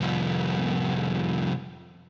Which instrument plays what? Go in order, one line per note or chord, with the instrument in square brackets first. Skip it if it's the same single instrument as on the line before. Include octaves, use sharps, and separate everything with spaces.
[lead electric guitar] C2 F2